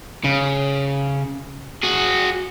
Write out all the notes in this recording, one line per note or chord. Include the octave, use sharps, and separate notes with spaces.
C#3
F#4 G#4